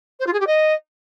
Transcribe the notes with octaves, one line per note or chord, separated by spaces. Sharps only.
C5
F4
G#4
G4
D#5